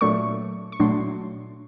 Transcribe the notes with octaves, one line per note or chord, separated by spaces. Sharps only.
A#2 F#3 A3 D4 C#6
C#6
A#2 F#3 A3 D4 C6